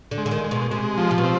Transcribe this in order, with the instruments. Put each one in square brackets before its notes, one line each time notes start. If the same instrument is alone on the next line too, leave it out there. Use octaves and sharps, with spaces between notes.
[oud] D3
[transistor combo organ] G#3
[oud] D3
D#3
[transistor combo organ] G#3
[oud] B2
[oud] C3 [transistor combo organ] G#3
[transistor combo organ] F3
[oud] C3
B2
[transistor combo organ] C4